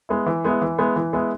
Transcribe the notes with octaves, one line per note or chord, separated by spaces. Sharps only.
G#3 B3 E4
E3
G#3 B3 E4
E3
G#3 B3 E4
E3
G#3 B3 E4